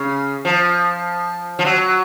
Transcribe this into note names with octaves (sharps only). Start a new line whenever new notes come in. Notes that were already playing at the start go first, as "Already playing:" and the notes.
Already playing: C#3
F3
F3
F#3